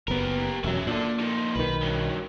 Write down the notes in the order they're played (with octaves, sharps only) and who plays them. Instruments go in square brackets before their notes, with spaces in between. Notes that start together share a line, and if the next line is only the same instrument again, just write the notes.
[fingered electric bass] F#1 B3 [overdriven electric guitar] G4 A#4
[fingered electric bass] E1 F#3 [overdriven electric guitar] C#4 E5
[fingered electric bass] A#2 [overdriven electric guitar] D4 A4
[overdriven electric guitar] F3 D#4
[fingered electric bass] B1 D#3 [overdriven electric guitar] B4
[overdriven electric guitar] G2 F#3